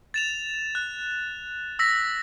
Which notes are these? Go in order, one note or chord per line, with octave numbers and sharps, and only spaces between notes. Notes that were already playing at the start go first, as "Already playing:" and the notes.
A6 E7 F7
F#6
E6 A#6 B6